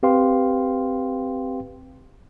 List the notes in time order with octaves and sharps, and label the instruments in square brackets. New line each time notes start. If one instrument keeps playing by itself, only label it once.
[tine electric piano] C4 G4 B4 F5 G5 C6